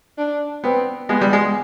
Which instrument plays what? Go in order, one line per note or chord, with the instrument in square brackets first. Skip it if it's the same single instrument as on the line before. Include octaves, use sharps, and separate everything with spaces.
[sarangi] D4
[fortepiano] B3 [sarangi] C4
[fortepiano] G#3 [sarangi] B3
[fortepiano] G3
G#3